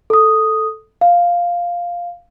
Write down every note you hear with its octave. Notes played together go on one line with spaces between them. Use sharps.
A4 D#6
F5